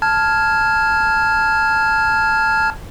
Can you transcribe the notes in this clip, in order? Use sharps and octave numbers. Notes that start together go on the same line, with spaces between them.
A5 F6 G#6